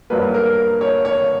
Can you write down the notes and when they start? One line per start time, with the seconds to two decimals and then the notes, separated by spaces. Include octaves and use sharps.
0.10 G2 F#3 A#3 B4
0.34 A#4
0.81 C#5
1.05 C#5